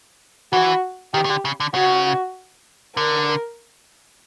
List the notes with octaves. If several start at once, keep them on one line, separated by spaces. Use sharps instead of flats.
E3 F#4
D#3 G4
D#3
D3
C#3
D3
C#3 F#4
D3 A#4